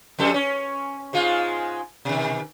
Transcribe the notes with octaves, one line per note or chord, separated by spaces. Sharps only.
F2 G3 A4
C#4
G#2 G#3 F4
B2 D#3